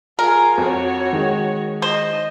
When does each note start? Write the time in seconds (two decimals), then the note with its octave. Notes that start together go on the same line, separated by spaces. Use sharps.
0.19 F4 G#4 A#4
0.58 F2 F#4 C#5
1.13 D#3 G#3
1.82 C5 D#5